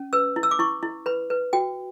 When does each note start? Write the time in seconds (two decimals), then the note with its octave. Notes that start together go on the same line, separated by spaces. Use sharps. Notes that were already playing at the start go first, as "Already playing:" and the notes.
Already playing: C#4
0.13 B4 E6
0.36 E4
0.43 E6
0.51 D6
0.59 E4 C#6
0.83 E4
1.06 B4 B5
1.30 B4
1.53 F#4 G5